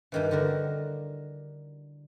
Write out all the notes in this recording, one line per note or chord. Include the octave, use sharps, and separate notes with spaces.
G2 D#3 E3
D3 F#4 A#4